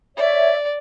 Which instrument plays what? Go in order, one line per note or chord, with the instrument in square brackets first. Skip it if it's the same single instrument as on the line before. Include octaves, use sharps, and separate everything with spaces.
[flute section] C#5 E5 [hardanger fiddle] D5